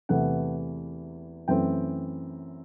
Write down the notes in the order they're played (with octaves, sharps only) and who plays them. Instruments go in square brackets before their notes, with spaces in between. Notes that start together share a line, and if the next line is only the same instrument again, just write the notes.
[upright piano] E2 C3 E3 A3 F#5
F#2 E3 A3 C4 G5